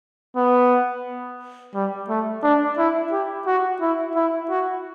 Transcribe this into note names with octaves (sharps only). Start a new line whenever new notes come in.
B3
G3
A3
D4
E4
G4
F#4
E4
E4
F#4